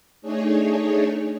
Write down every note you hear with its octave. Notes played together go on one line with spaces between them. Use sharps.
A3 D4 D#4 G#4 C#5